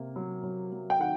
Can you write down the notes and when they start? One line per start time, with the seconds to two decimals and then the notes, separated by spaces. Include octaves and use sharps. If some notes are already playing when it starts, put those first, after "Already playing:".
Already playing: C3 A#3
0.16 F#3
0.43 F#3
0.72 F#3
0.90 G5
1.00 D#3 F#5